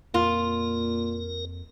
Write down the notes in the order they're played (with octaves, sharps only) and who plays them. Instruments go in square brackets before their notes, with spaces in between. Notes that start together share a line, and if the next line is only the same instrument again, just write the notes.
[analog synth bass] F2 [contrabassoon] A#2 [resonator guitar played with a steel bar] F4 [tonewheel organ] A#4